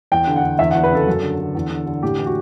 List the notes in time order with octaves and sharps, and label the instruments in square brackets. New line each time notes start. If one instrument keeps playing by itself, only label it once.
[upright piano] E2 G5
D3
F#5
D3
E2 E5
F#5
E2
B4
C#3 A4
F#2
D3
D3
E2
D3
D3
A2 G4
E3
F#4